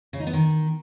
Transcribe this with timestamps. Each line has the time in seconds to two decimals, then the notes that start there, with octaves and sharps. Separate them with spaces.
0.13 C#3
0.20 D#4
0.27 B3
0.33 D#3